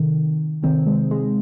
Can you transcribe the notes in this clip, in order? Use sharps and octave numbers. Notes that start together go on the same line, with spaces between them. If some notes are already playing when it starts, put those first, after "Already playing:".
Already playing: C3 D#3
C3 D#3 C4
G#3
G#3